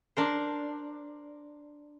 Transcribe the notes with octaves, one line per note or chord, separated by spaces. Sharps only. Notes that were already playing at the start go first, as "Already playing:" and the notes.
D4 A#4 C5